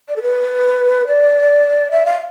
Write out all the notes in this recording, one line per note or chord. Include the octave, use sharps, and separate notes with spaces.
D5
A4
B4
D5
E5
F5